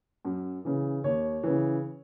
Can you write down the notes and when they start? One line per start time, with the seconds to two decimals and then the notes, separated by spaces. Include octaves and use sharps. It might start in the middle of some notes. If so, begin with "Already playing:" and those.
0.25 F#2
0.65 C#3 E3
1.04 D#2 C#5
1.43 C#3 E3